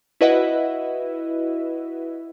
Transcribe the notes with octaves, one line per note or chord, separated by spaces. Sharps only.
E4 F#4 B4 D#5 E5 F#5